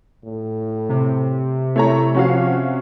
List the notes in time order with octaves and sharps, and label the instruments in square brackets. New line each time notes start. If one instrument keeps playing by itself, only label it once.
[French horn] A2
[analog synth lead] C3
[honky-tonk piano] A3 C#5 A#5 [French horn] E4
[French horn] F3 [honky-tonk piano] C#4 F#4 F5